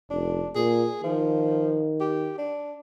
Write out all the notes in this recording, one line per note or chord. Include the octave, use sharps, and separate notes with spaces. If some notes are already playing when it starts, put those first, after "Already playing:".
F1 D4
A#2 G#4
D#3 F3
G4
D4